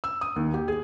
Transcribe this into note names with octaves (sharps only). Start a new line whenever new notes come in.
E6
D#6
D#2
G4
G#4